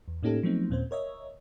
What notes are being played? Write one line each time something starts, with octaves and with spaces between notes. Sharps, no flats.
E2
A2 A#3 C#4 D#4 G4 A4
F3 F#3 A3 B3 C4 D#4
D#2 A#2 C4 C#4 C5
A#4 C#5 D#5 E5